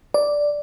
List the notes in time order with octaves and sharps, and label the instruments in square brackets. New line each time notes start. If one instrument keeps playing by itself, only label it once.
[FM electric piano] D5